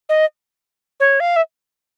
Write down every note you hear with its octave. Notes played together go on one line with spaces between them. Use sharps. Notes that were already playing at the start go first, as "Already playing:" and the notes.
D#5
C#5
F5
E5